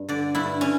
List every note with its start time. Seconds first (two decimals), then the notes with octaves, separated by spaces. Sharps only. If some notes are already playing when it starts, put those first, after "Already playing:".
Already playing: G2
0.09 D3 D5
0.35 G2 E4
0.61 C#4